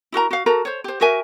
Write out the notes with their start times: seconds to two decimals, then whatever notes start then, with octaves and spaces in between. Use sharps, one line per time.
0.12 E4 F#4 A#4 A#5
0.31 F#4 F5
0.46 F#4 A4 A#4 A#5
0.65 C5 C#5
0.84 G4 C5
1.01 F#4 A#4 E5 G#5